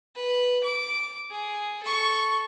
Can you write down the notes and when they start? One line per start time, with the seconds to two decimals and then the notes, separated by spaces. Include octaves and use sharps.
0.15 B4
0.63 D6
1.31 G#4
1.83 A4 C#6